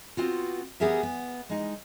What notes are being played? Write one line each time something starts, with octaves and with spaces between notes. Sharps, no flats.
B3 C4 F4 F#4
B3 G4 G#4 A#4 E5
B3
G#3 D#4